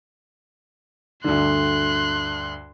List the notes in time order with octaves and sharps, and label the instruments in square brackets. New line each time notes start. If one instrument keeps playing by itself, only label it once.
[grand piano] D2 G2 D3 [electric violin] C6 F#6